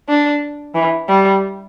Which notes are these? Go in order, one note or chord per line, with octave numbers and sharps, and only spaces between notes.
D4
E3
G3